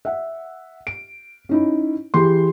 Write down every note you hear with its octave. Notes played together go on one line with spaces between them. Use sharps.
E5 F#5
D7
C#4 D#4 E4
E3 G4 G#4 C6